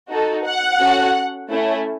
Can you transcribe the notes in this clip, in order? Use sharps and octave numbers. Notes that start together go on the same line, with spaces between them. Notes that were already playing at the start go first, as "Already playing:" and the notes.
D#4 F#4 A4
F#5
C#4 F#4 A4
A3 C#4 E4